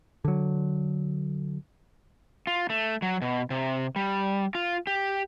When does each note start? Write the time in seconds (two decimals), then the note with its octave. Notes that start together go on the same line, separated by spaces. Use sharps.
0.25 D3 F#3
2.47 F4
2.70 A3
3.02 F#3
3.22 B2
3.50 C3
3.96 G3
4.55 F4
4.87 G4